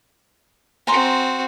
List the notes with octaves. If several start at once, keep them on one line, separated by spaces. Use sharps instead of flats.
C4 F#4 G#5 A#5 C6